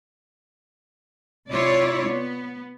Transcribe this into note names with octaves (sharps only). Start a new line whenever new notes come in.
C3 E4 F4 C#5 D5
B3